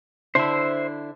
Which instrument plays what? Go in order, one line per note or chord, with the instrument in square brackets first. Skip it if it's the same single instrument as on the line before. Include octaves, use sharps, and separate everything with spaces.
[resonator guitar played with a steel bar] D3 D4 E4 [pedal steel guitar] C5 E5